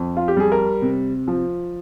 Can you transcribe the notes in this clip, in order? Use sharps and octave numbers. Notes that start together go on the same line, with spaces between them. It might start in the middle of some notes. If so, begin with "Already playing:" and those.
Already playing: F2
F4
G4
G3 G#4
A#4
C3
F3